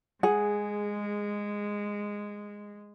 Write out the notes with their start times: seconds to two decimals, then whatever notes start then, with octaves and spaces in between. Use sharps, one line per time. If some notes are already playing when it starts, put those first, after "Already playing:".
0.23 G#3 G#4 F#5